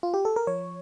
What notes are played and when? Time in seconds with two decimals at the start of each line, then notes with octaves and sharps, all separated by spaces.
0.03 F4
0.14 G4
0.25 A4
0.36 A#4
0.47 F3 C#5